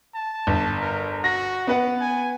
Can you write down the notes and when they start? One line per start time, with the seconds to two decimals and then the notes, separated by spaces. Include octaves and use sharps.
0.15 A5
0.47 G1
0.81 A#4
1.24 F#4 A#6
1.67 B3 B4 F#5
2.01 G#5